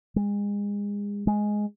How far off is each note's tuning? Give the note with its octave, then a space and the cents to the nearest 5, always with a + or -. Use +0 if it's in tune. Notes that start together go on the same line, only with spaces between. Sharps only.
G#3 -30
G#3 +5